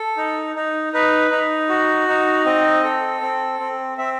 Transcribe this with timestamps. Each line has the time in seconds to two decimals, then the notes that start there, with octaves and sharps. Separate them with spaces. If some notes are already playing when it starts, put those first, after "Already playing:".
Already playing: A4
0.17 D#4
0.56 D#4
0.93 D#4 B4
1.31 D#4
1.69 F#4
2.08 D#4
2.45 C4 D#5
2.84 A4
3.21 C4
3.60 C4
3.98 C4 E5